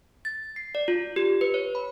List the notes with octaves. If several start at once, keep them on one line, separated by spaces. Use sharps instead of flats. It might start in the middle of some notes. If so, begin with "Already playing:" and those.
A6
C7
D5
F4
G4
B4
C#5
B5